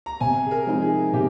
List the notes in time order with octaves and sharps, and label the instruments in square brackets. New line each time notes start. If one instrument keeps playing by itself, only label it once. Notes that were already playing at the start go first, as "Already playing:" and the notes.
[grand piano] A#5
[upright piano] C3 [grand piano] G#5
[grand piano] G#4
A#4
[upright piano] F3 G#3 C4 D#4
[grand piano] G#4
[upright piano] C3 [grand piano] G4